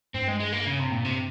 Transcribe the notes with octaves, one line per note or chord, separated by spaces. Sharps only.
G2 C4
G#3
G#3
A#3
C#3
C3
A#2
C3